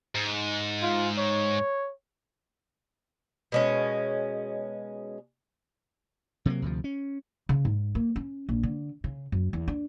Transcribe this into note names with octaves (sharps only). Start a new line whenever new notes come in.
G#2
F4
C#5
B2 G#3 C#4
C3 F#3 G3 A#3
D2 C3 F3
C#4
C#3
G#2
A#3
C#4
A#1
D3
C#3
F#2
E2
D4